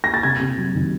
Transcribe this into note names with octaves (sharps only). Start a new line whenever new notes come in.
A#6
A6
C3 G#6
C3
F#3
D#3